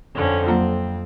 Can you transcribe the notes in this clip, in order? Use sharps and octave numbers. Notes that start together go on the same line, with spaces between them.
F2 D3 C#4
F#3 A#3 C4 F4